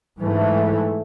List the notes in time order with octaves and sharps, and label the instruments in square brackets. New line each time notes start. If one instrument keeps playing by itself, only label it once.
[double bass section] G#2 E3 A3